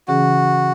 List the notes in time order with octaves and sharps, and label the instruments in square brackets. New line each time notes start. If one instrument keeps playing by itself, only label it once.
[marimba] C#3 E3 C#4 G#4 [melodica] F#4